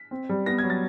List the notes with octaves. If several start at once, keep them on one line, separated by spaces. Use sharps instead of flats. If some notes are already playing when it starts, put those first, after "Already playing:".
Already playing: B6
C4
G3
B3 A#6
G#6
F#3
A6